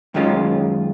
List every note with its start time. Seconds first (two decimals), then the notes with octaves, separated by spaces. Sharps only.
0.14 F#2 D#3 G#3 C#4 F4